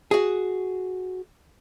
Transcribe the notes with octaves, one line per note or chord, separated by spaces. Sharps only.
F#4 G#4